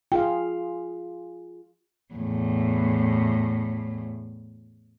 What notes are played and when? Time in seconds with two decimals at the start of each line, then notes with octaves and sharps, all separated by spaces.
0.12 F4 G#4 F5 G5
2.15 E2 A2